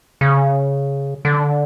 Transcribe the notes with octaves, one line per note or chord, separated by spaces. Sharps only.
C#3
D3